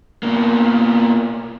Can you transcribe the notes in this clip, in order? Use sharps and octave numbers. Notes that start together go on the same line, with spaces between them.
B2 A#3